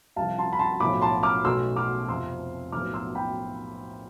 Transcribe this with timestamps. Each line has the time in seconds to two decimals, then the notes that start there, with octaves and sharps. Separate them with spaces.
0.16 C2 C3 F3 F5 A5
0.38 A5 C6
0.53 B5
0.59 A5 C6
0.80 B1 A2 F3 B5 D6
1.01 A5 C6
1.23 D6 F6
1.44 B1 B2 A3 C6 E6
1.76 D6 F6
2.08 F2 C3 F3 C4 C6 E6
2.72 B1 A2 F3 B3 D6 F6
2.94 C6 E6
3.15 G5 B5